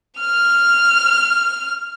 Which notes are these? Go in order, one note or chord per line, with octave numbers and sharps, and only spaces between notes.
F6 F7